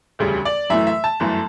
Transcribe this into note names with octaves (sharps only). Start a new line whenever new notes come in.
E1 D2 C#3 G3
D5
F#2 E3 A3 E5
E5
A5
G1 F#2 E3 A3